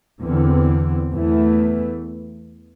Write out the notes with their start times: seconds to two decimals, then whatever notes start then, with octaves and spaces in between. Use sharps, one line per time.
0.23 E2 D3 C4
1.11 E2 E3 A3